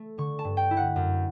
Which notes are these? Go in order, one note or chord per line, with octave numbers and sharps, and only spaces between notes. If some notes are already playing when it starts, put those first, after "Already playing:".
Already playing: A3
D3 C#6
A5
G2
G5
E4
F#5
F#2